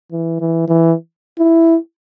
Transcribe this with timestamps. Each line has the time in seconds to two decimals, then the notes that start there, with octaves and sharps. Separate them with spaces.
0.12 E3
0.40 E3
0.68 E3
1.39 E4